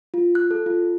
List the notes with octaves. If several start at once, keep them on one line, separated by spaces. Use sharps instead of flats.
F4
F#6
A4
F4